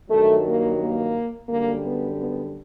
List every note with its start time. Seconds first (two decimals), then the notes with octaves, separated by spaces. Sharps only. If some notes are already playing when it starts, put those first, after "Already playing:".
0.10 G2 D#3 F#3 A3
0.46 A#3
0.80 A#3
1.48 F#2 D3 G3 A#3
1.83 B3
2.16 B3